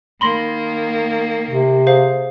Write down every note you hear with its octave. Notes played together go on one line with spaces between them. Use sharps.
D#3 A#3 B5 C6 A#6
C3
G#4 C5 F5